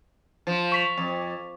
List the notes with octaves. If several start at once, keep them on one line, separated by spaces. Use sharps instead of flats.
F3
C#6 B6 F7
F2